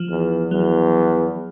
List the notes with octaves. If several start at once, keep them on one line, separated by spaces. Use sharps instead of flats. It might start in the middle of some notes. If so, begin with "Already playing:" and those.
Already playing: F3
E2
E2 F#3